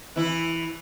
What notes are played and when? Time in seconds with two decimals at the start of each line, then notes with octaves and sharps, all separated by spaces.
0.16 E3 E4